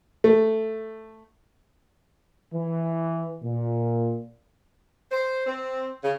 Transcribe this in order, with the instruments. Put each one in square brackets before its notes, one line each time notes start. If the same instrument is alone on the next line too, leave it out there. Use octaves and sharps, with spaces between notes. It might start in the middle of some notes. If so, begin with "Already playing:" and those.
[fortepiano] A3
[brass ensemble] E3
A#2
[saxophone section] C5
C4
C#3